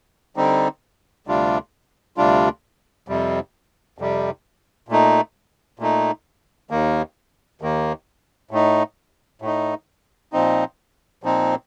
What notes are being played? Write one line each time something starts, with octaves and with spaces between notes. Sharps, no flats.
D3 G3 C4 D#4
D2 C3 G3 D4 F4
D2 C3 G3 D4 F4
F2 C3 G3
F2 C3 G3
A#2 A3 D#4
A#2 A3 D#4
D#2 D#3 A#3
D#2 D#3 A#3
A2 A3 D#4
A2 A3 D#4
A#2 F3 C4 D#4
A#2 F3 C4 D#4